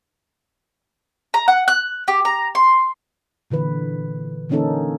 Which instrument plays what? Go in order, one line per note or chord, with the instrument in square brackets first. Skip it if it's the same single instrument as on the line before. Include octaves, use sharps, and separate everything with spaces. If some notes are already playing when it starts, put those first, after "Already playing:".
[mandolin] A#5
F#5
F#6
G4
A#5
C6
[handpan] A#2 D3 E3 B4
D3 E3 A#3 C#4 D#4 A4